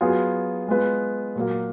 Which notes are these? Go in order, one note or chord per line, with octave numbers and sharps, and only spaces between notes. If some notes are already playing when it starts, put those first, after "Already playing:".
F#3 B3 F4 G#4
G#3 B3 F4 B4
A#2 F#3 A#3